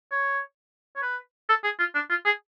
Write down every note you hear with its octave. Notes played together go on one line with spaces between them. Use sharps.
C#5
C#5
B4
A4
G#4
F4
D4
F4
G#4